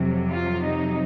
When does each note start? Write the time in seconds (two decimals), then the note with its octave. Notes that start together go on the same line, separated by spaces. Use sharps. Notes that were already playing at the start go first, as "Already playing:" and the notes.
Already playing: F2 C3 F#3
0.28 F4
0.61 D#4